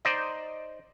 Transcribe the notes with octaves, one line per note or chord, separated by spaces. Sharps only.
D#4 C5 D5 D#5